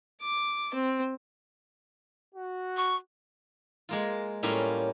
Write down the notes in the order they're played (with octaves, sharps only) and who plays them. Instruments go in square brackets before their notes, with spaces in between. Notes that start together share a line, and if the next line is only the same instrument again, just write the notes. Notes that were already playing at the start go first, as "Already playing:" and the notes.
[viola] D6
C4
[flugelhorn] F#4
[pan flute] C#6
[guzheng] G#3 A#3 F4
A2 G3 A#3 C#4 F4